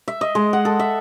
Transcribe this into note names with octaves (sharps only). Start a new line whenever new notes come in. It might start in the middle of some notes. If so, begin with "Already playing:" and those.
E5
D#5
G#3
F#5
A4
E5